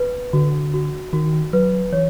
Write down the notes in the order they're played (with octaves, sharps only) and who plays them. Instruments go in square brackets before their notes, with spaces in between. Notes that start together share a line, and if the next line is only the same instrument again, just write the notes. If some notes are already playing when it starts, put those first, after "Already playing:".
Already playing: [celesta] B4
[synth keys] D3 [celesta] F#4
[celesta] F#4
[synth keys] D#3 [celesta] F#4
[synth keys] F#3 [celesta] B4
[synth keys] E3 [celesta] C#5